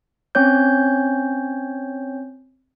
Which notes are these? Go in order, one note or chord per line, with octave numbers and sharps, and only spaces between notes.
C4 C#4 C#5 G6